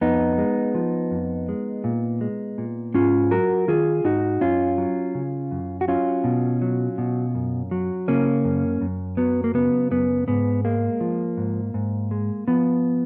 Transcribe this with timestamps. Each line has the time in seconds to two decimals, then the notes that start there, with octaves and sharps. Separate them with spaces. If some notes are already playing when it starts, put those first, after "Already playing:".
0.01 F2 B3 D#4
0.38 G#3
0.75 F3
1.11 F2
1.49 G#3
1.84 A#2
2.21 G#3
2.58 A#2
2.94 G#2 C#4 F4
3.31 F#3 F#4 A#4
3.68 D#3 F4 G#4
4.04 G#2 D#4 F#4
4.41 F#2 C#4 F4
4.78 F#3
5.15 C#3
5.51 F#2
5.81 F#4
5.88 F#3 C#4 F4
6.24 B2
6.62 F#3
6.98 B2
7.35 F#2
7.71 F#3
8.08 C#3 A#3 C#4
8.44 F#2
8.81 F#2
9.17 F#3 B3
9.44 A#3
9.54 C#3 B3
9.91 F#2 B3
10.28 G#2 B3
10.64 G#3 A#3
11.01 F3
11.37 G#2
11.74 G#2
12.11 G#3
12.48 F3 B3